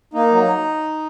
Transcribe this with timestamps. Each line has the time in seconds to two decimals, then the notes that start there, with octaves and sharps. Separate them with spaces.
0.14 A#3 D#4
0.32 F#3